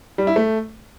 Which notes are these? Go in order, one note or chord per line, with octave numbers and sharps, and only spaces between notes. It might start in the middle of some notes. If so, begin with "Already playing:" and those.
G3
E4
A3